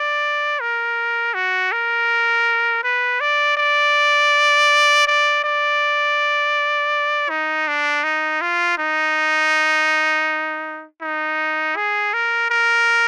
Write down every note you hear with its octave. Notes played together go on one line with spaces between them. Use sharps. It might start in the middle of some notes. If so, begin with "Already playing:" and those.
Already playing: D5
A#4
F#4
A#4
B4
D5
D5
D5
D5
D#4
D4
D#4
F4
D#4
D#4
G#4
A#4
A#4